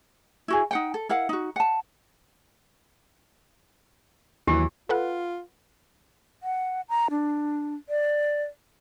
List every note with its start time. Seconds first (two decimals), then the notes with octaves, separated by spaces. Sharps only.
0.48 E4 F#4 G#4
0.71 D#4 F#5 G5
0.94 A4
1.09 E4 A#4 F5 F#5
1.29 D#4 F#4
1.56 F#5 A5
4.47 D#2 E3 F#3 G4
4.89 F4 A4 B4 F#5
6.43 F#5
6.89 A#5
7.11 D4
7.89 D5